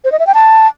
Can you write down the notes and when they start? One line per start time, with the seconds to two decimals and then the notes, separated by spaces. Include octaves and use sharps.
0.04 C5
0.12 D#5
0.19 E5
0.27 G5
0.34 A5